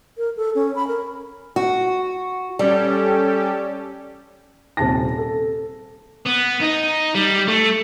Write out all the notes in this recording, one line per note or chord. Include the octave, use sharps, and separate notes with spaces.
A#4
A4
C#4
B5
A#4
F#4
G3 C#4 G4 A4
D#1 C3 A5 A#6
A4
B3
D#4
G3
A3